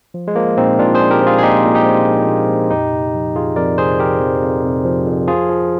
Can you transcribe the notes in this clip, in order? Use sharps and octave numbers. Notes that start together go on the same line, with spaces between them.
F3
G#3
F3 A#3
A#2 C4 D#4
A#2 D4 F4
G#4 C5
F3
G4 A#4
F3
F4 G#4
G#4
A#2 D#4 G4
A#2
D#4 G4
F3
F3
A#2
A#2
F2 D#4 G4
C3
F3
F2 F4 G#4
F2 A#4 D5
C3 G#4 C5
F3 G4 A#4
F2
F2
C3
F3
F2
F3 F4 G#4
F3